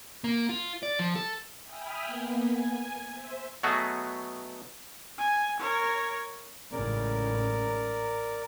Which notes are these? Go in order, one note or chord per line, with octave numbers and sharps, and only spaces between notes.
A#3
F4
D5
F3
A4
E5 G5 G#5 B5 D#6 F6
A#3 B3
G#5
C5 E5
B2 F#3 A3 B3 F#4 G#4
G#5
A#4 C#5
A1 G#2 C#3 A#4 D5